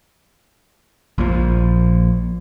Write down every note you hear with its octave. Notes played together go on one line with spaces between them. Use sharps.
A#1 A#2 F3